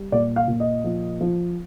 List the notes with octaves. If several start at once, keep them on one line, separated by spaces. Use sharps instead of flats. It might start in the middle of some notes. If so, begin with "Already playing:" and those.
Already playing: G3
A#2 D5
F5
A#2
D#5
F3
F3